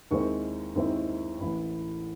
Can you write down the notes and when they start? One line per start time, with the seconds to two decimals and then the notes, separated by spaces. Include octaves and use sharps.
0.11 D#2 D#3 G#3 C4 E4 C#6
0.76 D#2 D#3 G#3 C4 E4
1.40 A1 A2 E3 B5